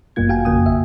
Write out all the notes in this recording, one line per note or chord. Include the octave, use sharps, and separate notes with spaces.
G1 F#2 B2 A#3 F4 G#6
F#4 F5 G5 G#5
A1 F2 C#3 A#3 G#5 D#6
E5